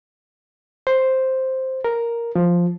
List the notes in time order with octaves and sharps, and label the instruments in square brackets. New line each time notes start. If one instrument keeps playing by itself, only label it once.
[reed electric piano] C5
A#4
F3